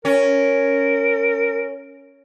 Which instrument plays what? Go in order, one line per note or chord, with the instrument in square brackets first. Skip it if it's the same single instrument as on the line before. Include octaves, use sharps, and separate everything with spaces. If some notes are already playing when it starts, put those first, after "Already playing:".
[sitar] C#4 [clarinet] A#4